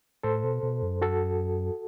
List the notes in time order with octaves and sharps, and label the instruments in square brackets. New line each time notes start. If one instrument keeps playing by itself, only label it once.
[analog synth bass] A2 [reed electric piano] A4 C5
[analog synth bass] B2
B2
F#2
[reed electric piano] F#4 A4